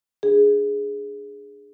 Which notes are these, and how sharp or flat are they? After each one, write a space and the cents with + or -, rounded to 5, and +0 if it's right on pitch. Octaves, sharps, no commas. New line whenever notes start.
D4 +0 G#4 +0